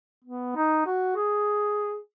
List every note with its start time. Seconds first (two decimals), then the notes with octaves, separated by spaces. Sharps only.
0.25 B3
0.56 D#4
0.86 F#4
1.16 G#4